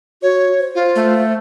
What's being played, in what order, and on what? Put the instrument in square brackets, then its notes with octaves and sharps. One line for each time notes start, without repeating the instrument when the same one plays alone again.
[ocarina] F#4 [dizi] C#5
[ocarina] C5
[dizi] F4
[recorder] A3